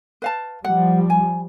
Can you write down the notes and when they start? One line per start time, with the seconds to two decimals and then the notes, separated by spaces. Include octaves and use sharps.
0.22 B4 F5 A5
0.64 F3 G3 F#5
1.10 G#5